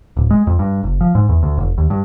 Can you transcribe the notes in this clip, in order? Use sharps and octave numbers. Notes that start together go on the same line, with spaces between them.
D1
G#3
F2
G2
F#1
F3
G#2
E2
D2
F1
D#2
G2